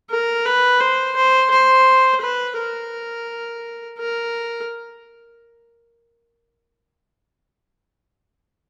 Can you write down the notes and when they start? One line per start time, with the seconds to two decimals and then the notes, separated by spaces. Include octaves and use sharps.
0.10 A#4
0.45 B4
0.81 C5
1.16 C5
1.51 C5
2.21 B4
2.57 A#4
3.98 A#4